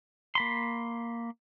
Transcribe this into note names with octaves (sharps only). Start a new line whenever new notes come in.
A#3 B5 C6